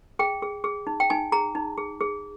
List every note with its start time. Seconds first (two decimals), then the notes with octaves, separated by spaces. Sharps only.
0.19 G#4 G5
0.42 G#4
0.64 G#4
0.87 D#4
1.00 G5
1.10 D#4 G#5
1.32 G#4 A#5
1.55 D#4
1.77 G#4
2.01 G#4